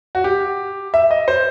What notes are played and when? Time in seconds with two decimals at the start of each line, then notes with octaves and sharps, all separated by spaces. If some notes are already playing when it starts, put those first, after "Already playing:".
0.15 F#4
0.24 G4
0.94 E5
1.11 D#5
1.28 C5